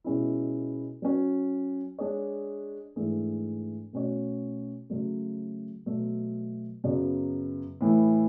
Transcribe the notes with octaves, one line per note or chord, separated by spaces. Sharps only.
B2 G#3 C#4 E4
F#3 C#4 F#4
G#3 D4 G#4 C#5
G#2 E3 A3 D4 G#4
B2 A3 C#4 F#4 C#5
C#3 F#3 A3
B2 F#3 A3
F#2 C#3 F#3 B3
A2 E3 A3